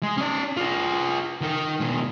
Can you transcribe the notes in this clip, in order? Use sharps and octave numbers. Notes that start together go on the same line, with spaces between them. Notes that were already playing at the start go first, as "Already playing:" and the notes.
G#3
C#4 D5
F4 G#4
D#3 A#4
B2 G#3